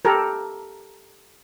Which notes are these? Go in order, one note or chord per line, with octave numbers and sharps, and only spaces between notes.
G4 A4 A#4